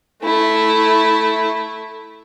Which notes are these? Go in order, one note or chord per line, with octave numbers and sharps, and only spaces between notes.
A3 E4